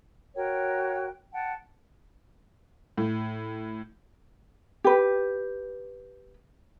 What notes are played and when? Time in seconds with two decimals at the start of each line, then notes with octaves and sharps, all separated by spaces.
0.36 F#4 A#4 C#5 G5
1.33 F#5 G5 A5
2.98 A2
4.84 G4 B4